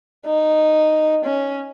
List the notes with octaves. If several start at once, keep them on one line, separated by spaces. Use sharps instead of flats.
D#4
C#4